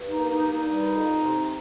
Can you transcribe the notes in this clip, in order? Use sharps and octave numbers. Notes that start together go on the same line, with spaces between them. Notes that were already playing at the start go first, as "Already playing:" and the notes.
Already playing: G2
D#4
A#3
D#4
G2
D#4
G3
F2
C3